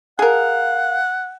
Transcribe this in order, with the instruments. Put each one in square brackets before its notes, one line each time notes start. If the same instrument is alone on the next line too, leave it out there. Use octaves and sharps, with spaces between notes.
[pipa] G#4 A#4 [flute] F5 [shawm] F#5